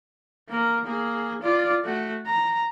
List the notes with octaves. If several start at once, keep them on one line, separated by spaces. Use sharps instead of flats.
A#3 A#4
A#3 G#4
F4 D5
A3 F#4
A#5